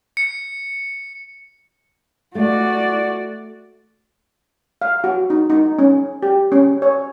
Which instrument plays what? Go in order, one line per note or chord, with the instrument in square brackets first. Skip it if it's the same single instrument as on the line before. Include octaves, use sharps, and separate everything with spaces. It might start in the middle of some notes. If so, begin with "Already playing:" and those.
[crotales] C#7
[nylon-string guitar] A3 [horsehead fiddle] F#4 D5
[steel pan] F5
F#4
D#4
D#4
C#4
G4
C#4
C#5